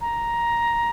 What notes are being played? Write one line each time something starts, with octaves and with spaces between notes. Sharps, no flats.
A#5